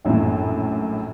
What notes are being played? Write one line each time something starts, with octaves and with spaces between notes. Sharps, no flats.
A#1 F#2 A2 E3